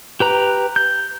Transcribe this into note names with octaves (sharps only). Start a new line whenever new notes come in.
G4 B4 A#5
G6